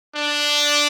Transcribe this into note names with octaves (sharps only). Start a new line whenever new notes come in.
D4